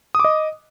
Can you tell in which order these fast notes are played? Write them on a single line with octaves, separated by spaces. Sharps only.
D#6 D6 D#5